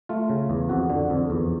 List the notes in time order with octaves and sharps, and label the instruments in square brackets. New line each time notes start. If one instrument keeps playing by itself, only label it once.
[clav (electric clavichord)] A3 F4
C#3
E2
F2 F#4
D3
F2
E2